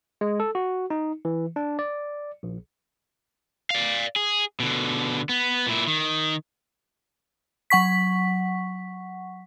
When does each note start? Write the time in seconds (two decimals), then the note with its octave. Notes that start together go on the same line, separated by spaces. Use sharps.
0.21 G#3
0.40 A4
0.55 F#4
0.90 D#4
1.25 E3
1.56 D4
1.79 D5
2.43 A#1
3.70 D5 F5
4.16 G#4
4.60 B2 D3
5.29 B3
5.67 A#2 E4
5.87 D#3
7.70 F#3 F#5 C#6 B6